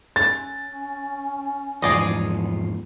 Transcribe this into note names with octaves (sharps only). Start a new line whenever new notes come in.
C#4 A6
E2 G#2 F3 G#4 D5 D#5